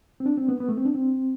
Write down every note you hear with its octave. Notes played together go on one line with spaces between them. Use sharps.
C4
D4
C4
B3
B3
A3
C4
D4
C4